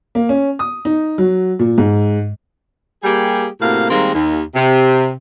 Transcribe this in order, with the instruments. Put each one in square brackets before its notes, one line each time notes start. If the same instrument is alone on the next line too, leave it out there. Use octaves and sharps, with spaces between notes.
[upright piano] A#3
C#4
D#6
D#4
F#3
A#2
G#2
[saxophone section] G3 A#3 G4 G#4
A2 C3 A#3 F#4 F5
D#3 G3 G#3 A#3 C4
D#2
C3